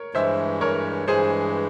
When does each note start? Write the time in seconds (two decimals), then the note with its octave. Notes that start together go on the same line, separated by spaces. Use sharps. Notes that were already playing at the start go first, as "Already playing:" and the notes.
Already playing: A#4 C#5
0.14 G2 E3 G#3 C5 E5
0.61 A#4 C#5
1.07 G2 E3 G#3 G#4 C5